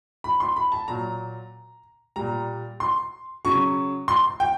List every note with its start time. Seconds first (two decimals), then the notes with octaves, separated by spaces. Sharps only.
0.24 B5
0.40 C6
0.56 B5
0.72 A5
0.88 A#2 F#3 A#5
2.16 A#2 G3 A#5
2.80 C6
3.45 C#3 F#3 C#6
4.08 C6
4.40 G5